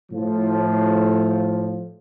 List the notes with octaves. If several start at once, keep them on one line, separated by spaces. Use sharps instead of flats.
A2 F3